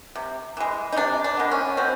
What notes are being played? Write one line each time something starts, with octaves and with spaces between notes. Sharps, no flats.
C3
E3 G#3
D#4
C3 D4
D4
D#3 G#3 B3
C#4
B2 C4